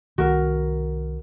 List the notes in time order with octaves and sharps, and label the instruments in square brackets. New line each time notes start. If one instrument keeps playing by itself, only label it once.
[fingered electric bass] C2 D#3 [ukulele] F#4 A#4